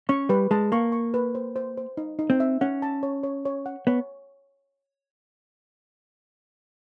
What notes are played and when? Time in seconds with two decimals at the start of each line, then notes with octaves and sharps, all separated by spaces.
0.09 C#4 C#6
0.29 G3 B4
0.51 G#3 A5
0.72 A#3 C#6
0.92 C#6
1.14 B4
1.35 C5
1.56 C5
1.77 C5
1.97 D#4
2.19 D#4
2.30 C4
2.40 E5
2.61 C#4 F#5
2.82 A5
3.03 C#5
3.23 C#5
3.45 C#5
3.66 F#5
3.87 B3 C#5